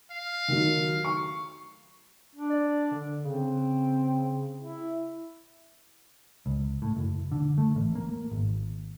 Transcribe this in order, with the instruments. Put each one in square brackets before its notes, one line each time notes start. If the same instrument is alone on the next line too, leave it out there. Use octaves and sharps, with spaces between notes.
[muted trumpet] F5
[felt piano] D#3 F#3
C#6
[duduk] D4
[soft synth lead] D5
D3
[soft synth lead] C#3 [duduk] C4
[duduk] E4
[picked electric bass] C#2
A2
F#1
D3
A3
A1
A#3
G#1